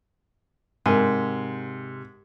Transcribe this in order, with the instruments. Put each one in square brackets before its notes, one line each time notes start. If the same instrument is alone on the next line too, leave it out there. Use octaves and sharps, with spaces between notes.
[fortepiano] G#2 [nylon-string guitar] C3 [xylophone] A#4 G#5